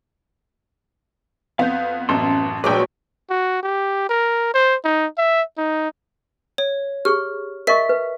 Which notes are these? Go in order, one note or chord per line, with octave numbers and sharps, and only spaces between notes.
F2 B3 F5 F#5 G6
A1 F#2 A5 C6
A#1 A#2 F3 F#3 G#3 B4 G5 D6
F#4
G4
A#4
C5
D#4
E5
D#4
C#5
G4 G#4 C#6 F6
A#4 D#5 E5 C#6 B6
B4